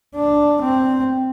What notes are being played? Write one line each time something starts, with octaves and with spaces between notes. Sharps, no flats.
D4
C4